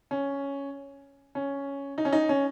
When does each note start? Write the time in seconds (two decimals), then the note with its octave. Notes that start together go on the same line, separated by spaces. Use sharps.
0.11 C#4
1.35 C#4
1.98 D#4
2.05 C#4
2.13 D#4
2.29 C#4